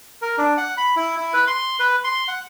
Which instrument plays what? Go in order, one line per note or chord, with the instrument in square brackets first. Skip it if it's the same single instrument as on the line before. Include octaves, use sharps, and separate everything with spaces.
[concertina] A#4
D4
F#5
B5
E4
E4
B4
C6
B4
C6
F#5